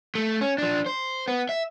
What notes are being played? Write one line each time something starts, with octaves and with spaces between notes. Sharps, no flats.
A3
C#4
F3 D4
C5
B3
E5